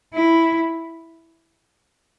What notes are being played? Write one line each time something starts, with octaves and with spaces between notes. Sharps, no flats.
E4